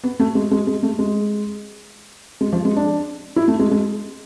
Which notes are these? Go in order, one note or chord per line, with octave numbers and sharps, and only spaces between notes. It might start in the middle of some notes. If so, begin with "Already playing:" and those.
B3
A3
G#3
G#3
G#3
A3
G#3
G#3
F3
G#3
D4
E4
A3
G#3
G#3